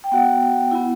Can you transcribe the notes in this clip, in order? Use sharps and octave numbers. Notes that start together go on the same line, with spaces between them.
G5
B3 F#4 F#5
B3 E4